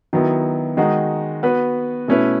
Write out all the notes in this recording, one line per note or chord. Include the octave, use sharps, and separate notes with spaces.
D#3 F#3 B3 E4
D#3 G#3 D#4 F#4
B3 F#4 B4
B2 A3 C#4 E4 B4